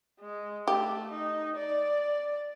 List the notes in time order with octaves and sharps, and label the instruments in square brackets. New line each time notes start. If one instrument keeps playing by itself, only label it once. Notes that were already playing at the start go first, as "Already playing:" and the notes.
[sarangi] G#3
[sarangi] A3 [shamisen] G4
[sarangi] D#4
D5